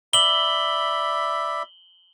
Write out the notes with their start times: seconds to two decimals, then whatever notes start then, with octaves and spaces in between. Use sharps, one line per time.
0.13 D5 E5 B5 F#7 G7